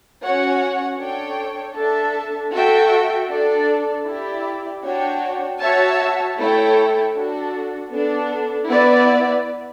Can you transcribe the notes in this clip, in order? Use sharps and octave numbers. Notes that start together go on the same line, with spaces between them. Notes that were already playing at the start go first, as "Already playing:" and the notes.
C#4 F#4 C#5 F#5
D4 A4 C#5 G5
D4 A4 E5 A5
F#4 A4 E5 G5
D4 A4 D5
E4 G4 D5
D4 F#4 C#5 G5
F#4 C#5 E5 A5
A3 E4 A4 C#5 G5
D4 F#4 A4
B3 D4 A4
B3 E4 B4 D5